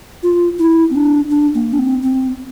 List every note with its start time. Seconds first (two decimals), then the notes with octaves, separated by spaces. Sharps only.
0.23 F4
0.59 E4
0.90 C4
0.96 D4
1.30 D4
1.55 A#3
1.73 D4
1.79 C4
2.02 C4